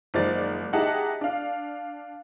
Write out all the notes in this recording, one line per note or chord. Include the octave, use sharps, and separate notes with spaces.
F#1 D#3 F3 G#3 D5 A6
D#4 E4 G4 G#4 F#5 A5
D4 F5